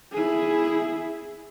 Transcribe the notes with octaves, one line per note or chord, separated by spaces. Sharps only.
E4 G#4